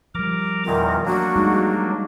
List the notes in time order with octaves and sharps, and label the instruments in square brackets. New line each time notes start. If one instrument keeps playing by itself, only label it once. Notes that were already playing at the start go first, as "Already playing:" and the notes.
[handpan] F3 G3 [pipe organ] A#4 A#5 D6
[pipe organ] E2 A#2 D#3 [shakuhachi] A#4
[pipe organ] F#3 A#3 D4 [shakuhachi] F#4
[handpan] G3 G#3 D#4